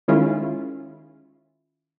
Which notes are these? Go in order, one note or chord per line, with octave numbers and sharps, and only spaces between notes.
D#3 G#3 C#4 E4 F4